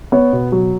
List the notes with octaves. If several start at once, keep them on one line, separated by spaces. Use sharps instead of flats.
B3 C#5
B2
F#3